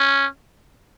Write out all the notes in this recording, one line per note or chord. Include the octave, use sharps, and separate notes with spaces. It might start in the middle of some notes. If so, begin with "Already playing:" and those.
Already playing: C#4